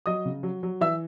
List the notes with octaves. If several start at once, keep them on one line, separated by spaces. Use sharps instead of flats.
F#3 D#5 D#6
C#3
F#3
F#3
E3 E5 E6